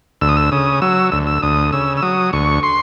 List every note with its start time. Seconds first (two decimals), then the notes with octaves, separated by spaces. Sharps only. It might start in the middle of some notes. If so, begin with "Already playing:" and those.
0.21 D2 E6
0.29 D#6
0.37 E6
0.52 C#3 D#6
0.82 F#3 E6
1.12 D2 E6
1.27 E6
1.43 D2 D#6
1.72 C#3 E6
1.97 E6
2.02 F#3 D#6
2.33 D2 C#6
2.63 C6